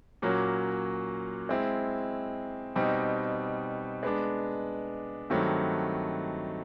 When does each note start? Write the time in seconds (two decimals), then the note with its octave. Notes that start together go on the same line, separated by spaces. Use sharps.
0.22 A#2 F#3 A#3 C#4 F#4
1.49 G#3 C4 E4
2.76 B2 G3 C4 D#4
4.03 G#3 B3 D4
5.30 G2 D#3 F#3 A3 C4